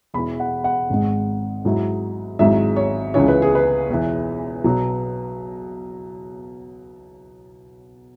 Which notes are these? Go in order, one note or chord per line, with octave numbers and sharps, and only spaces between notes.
E1 E2 E3 B5
F#5
F#5
G#1 G#2 G#3
G#2 F#3 E4
G#1 G#2 F#3 E4 E5
C#5
C#2 C#3 E3 C#5
B4
G#4
B4
E1 E2 E3
B1 B2 F#3